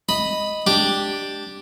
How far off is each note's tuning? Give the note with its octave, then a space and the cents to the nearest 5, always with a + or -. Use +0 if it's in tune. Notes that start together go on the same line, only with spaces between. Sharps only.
D#5 +0 B5 +0
D4 +0 G4 +0